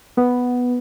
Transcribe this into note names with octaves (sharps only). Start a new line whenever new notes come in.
B3